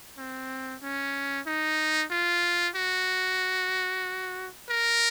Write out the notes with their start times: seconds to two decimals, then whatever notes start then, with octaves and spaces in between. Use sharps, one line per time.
0.18 C4
0.82 C#4
1.46 D#4
2.11 F4
2.76 F#4
4.69 A#4